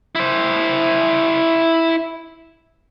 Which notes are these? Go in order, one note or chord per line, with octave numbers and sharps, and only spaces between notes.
E4 C5